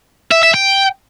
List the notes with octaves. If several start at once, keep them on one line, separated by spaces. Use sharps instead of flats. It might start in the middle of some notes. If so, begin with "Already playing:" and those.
E5
E5
G5